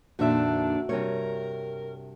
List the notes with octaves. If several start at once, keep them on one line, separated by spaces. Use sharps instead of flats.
F2 A#2 D#3 D4 F#4 E5
G2 C3 A#4 C#5